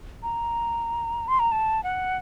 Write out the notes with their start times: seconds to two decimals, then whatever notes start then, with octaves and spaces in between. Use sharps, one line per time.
0.23 A#5
1.28 C6
1.39 A#5
1.52 A5
1.84 F#5